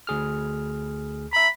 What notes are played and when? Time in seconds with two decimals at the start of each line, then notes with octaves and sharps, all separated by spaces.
0.07 D2 G#4 F6
1.33 E5 A#5 B5